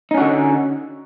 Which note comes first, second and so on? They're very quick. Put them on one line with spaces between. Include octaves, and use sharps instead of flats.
D#4 C#4 F#4 D3